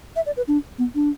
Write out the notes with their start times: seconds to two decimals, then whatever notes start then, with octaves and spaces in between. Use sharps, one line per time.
0.16 E5
0.26 D5
0.37 B4
0.48 D4
0.78 B3
0.95 D4